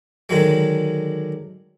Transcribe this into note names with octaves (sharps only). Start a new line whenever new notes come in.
D3 D#3 F#3 G#3